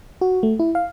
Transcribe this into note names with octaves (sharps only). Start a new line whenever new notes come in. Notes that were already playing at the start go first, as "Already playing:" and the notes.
F#4
A3
E4
F5